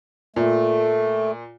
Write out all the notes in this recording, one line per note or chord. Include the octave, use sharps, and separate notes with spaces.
A#2 A3